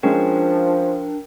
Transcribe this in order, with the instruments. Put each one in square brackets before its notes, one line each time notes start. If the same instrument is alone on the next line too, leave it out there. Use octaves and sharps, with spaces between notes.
[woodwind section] F3 [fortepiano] G#3 C#4 [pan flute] D4 [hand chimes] A#4 G5